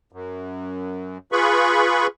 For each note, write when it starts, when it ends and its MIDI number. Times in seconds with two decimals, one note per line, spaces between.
0.12 1.18 42
1.32 2.07 65
1.32 2.07 68
1.32 2.07 71
1.32 2.07 83
1.32 2.07 85